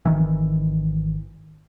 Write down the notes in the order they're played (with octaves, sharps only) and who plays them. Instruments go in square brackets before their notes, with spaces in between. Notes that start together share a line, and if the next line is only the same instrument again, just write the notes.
[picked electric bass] G#1 D#3 E3